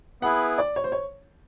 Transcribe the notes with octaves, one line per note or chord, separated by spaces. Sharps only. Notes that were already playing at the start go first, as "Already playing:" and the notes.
B3 E4 G#4 B4 F#5
D5
C#5
C5
C#5